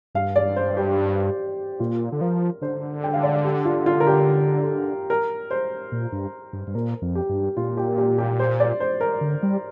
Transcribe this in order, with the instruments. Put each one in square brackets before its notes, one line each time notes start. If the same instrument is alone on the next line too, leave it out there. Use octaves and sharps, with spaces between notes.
[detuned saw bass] G2 [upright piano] F5
[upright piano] D5
C5
G4
[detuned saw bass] A#2 [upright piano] F4
[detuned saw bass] D3
[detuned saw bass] F3 [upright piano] A#4
[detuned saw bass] D3 [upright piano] C5
[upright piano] G5
F5
D5
F5
G4
F4
F4
A#4
G4
A#4
C5
[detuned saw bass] A#2
G2
G2
G2
[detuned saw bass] A#2 [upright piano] A#4
[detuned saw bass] F2
[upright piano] G4
[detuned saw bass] G2
[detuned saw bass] A#2 [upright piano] F4
[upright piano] G4
G4
G4
C5
D5
C5
A#4
[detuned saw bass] D3
G3